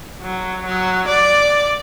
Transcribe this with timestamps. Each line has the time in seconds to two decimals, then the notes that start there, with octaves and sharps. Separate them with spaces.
0.21 F#3
0.66 F#3
1.07 D5